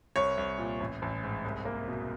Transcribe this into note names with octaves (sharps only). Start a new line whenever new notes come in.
C2 C#5
C2
A#2
A1
A1
G#2
C2
A#3
B2